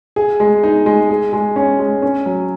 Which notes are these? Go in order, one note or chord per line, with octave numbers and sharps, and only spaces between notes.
G#4
G#3
D#4
G#3
G#4
G#3
C#4
G#3
C#4
F#3